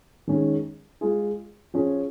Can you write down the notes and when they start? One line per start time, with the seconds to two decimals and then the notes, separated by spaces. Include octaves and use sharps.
0.27 D#3 G#3 C#4 G#4
1.01 G#3 F4 G#4
1.74 F3 C#4 G#4